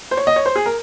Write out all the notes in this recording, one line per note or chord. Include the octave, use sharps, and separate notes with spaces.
C5
C#5
D#5
C#5
C5
G#4
A#4